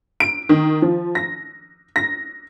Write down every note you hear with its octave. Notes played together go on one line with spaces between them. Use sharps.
D7
D#3
F3
A#6
A#6